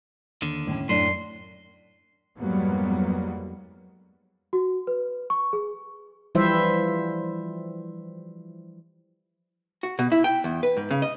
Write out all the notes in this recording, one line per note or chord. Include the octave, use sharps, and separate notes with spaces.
D#2 D3
A2 C#4
F#2 A2 D4 C6
F2 G#2 F#3 G3 A#3 B3
F#4
B4
C#6
G#4
E3 F3 G3 E4 C5 E5
F#4
B2
E4
G5
E2
B4
G#2
C#3
D#5